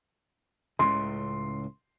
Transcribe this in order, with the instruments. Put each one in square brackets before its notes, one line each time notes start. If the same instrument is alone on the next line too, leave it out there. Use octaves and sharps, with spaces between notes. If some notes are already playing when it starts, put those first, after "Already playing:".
[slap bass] C#2 A2 C#3 [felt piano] C6